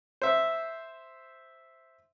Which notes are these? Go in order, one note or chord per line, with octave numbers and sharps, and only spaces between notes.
C5 E5